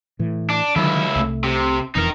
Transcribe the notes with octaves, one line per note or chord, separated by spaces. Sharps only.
A2 E3
D4
C#2 D3 D#3 F#3 E4
C2 A3
C3
E1 F2 E3 D#4 A#4